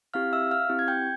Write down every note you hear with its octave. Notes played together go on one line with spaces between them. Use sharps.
C4 E4 G4 F5 F6
E5 E6
F5 F6
C4 E4 G4
G#6
G5 G6